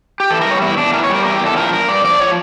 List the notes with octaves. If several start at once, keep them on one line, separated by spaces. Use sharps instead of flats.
G4
E3 A4
G3 A#4
C#5
E2 E4
E2 D4
E3 A#4
C#5
G3 A#4
E2 A#4
G4
E2
A4
F3 A#4
G2 A#4
G2 D5
F3 D5
F3 C#5